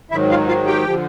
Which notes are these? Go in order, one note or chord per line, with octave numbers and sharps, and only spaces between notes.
G#2 D#3 F#3 E4 E5
F4 F5
F4 F5
G4 G5
D3 F3